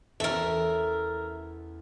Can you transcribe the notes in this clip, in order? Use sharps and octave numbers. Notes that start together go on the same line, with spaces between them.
E2 C#4 A4 A#4 E5